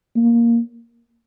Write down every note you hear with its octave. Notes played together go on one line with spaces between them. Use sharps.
A#3